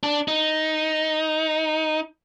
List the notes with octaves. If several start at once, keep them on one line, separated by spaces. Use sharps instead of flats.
D4
D#4